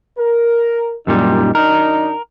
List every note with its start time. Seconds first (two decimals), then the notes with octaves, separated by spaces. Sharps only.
0.18 A#4
1.07 C2 F#2 A#2 D#3 G3 D#4
1.55 F#2 D4 D#4 A#4